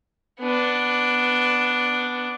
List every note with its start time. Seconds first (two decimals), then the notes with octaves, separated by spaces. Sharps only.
0.40 B3 D4